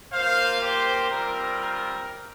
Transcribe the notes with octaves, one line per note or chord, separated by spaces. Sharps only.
A#3 F4 C5 F5
G4 C5
G3 C4 F4 A#4
A#4